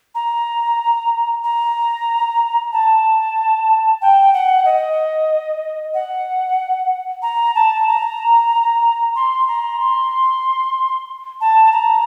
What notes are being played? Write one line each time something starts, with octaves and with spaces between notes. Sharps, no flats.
A#5
A#5
A5
G5
F#5
D#5
F#5
A#5
A5
A#5
C6
A#5
C6
A5
A#5